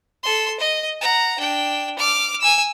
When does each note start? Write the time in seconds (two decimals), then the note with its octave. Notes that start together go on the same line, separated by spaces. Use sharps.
0.23 A4 C6
0.60 D#5
1.01 F#5 A#5
1.39 D4 G5
1.99 D6 F6
2.41 G#5 E6